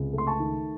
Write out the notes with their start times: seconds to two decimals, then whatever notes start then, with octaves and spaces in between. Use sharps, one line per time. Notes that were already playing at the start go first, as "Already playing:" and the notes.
Already playing: C#2 C3
0.13 A3
0.18 C6
0.27 A5 C#6
0.40 D#3